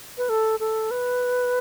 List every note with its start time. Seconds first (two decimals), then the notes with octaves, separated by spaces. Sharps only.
0.18 B4
0.29 A4
0.60 A4
0.91 B4